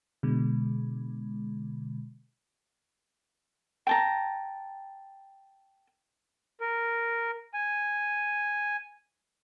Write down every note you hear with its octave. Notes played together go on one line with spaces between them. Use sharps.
B2 D3 G#3
G5 A5 A#5
A#4
G#5